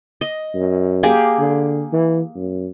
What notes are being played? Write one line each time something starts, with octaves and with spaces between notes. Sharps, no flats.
D#5
F#2
A#3 G4 G#4
D3
E3
F#2